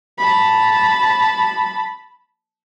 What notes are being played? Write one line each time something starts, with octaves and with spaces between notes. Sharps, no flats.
A5 B5